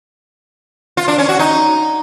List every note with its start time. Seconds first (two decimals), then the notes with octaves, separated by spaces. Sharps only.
0.97 F4
1.08 D4
1.18 C#4
1.29 F#4
1.39 D#4